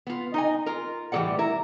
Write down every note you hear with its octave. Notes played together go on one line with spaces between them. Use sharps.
B3 F4
D#4 D#5 G#5
F4 A#4
A2 E3 G3 A4 D5 F#5
E4 A#4